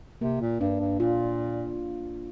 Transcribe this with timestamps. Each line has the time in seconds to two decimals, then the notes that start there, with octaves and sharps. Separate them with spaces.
0.21 C3 A#3
0.41 A#2
0.61 G2 D4
0.80 G2
1.00 A#2 F4